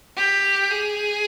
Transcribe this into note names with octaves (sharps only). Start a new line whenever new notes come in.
G4
G#4